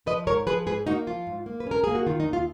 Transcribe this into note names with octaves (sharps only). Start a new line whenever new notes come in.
F3 B4 D#5
G#2 A#4 C#5
F3 G#4 B4
G#2 G#4 B4
A#3 D#4 F#4
F3 F4
G#2
A#3
B4
C#4 A#4
A#3 G#4
F#4
D#3 F4
D#4
D#2
F4